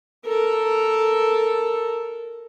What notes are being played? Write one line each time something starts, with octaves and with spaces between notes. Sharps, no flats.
A4 A#4